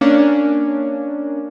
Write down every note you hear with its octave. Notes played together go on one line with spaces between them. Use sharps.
A#3 C#4 D4